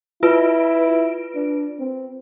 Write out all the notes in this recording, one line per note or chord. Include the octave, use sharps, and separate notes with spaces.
E4 F4 B4 D7
D4
C4